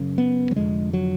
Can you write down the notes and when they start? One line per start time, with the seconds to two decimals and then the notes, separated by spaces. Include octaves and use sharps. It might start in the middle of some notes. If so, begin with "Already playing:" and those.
Already playing: F#1 F#2 C#3
0.18 B3
0.51 F#3
0.56 F1 F2 D3 G#3
0.93 F#3